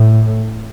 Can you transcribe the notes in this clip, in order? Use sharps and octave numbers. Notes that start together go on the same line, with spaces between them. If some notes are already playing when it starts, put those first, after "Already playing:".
Already playing: A2